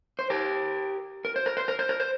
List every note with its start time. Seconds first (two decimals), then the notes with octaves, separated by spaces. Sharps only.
0.19 C5
0.30 G4 A#4
1.25 A#4
1.36 C5
1.46 A#4
1.57 C5
1.68 A#4
1.79 C5
1.89 A#4
2.00 C5